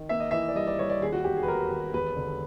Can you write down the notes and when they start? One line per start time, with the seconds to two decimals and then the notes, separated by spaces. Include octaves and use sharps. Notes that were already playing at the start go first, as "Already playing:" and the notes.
Already playing: D#3
0.09 A#3 E5
0.20 D#5
0.31 E3 E5
0.48 D5
0.55 G2 D#5
0.67 D5
0.79 G2 C#5
0.90 D5
1.01 D#2 G#4
1.13 F#4
1.24 E1 G4
1.37 G#4
1.43 B4
1.48 D#2 A#4
1.71 D#2
1.93 E1 B4
2.16 D3